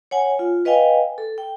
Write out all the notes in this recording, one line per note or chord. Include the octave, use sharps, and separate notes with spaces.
C#5 F#5 G#5
F4
B4 D#5 F5 G5 G#5
A4
G5